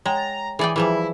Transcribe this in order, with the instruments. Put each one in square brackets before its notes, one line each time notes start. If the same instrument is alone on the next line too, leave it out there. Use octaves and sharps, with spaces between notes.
[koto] G#3 [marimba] C#5 F#5 G5 [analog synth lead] A#5
[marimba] A6
[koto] E3 D5 G5 [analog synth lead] G#4
[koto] E3 F3 G3 [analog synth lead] E4 [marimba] G#4 B4 G#5